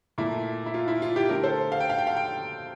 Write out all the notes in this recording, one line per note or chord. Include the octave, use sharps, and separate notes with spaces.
A#2 A3 E4
E4
F4
E4
F4
E4 G4
D3 A3 G4 A#4
A4 C5
F5
G5
F5
G5
F5
G5